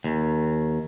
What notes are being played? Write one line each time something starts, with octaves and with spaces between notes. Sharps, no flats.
D#2